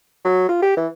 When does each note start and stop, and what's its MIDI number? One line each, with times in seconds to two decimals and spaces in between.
0.25 0.45 54
0.49 0.60 65
0.62 0.76 67
0.77 0.87 52